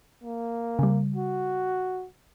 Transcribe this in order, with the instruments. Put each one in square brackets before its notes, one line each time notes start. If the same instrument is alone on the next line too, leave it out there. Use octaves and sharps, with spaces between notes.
[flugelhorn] A#3
[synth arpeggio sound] C#3 G3
[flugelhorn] F#4